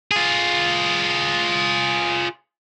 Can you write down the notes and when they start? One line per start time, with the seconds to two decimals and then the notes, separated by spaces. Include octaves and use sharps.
0.11 F4 G#4